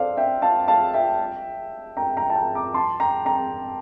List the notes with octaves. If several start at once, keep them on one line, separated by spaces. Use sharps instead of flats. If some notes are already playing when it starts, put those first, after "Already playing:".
Already playing: A4 C5 D5 F5
E5 G5
F5 A5
F5 A5
E5 G5
G5 A#5
G5 A#5
A5
G5 A#5
A#5 D6
A5 C6
G5 A#5
G5 A#5